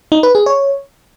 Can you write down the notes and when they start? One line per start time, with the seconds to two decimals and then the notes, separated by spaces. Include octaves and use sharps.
0.12 D#4
0.23 B4
0.35 G#4
0.46 C#5